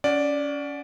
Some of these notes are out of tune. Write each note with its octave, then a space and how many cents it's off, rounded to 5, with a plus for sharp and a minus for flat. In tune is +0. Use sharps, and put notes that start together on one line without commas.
C#4 +25 D5 +0 F#5 +0